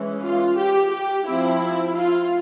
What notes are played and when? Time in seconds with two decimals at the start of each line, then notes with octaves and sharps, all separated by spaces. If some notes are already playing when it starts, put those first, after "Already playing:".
Already playing: E3 G#3 C#4
0.22 F4
0.57 G4
0.92 G4
1.27 F3 C4 E4
1.96 F4